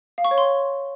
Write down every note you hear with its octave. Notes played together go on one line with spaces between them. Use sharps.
F5
C#6
C#5
C6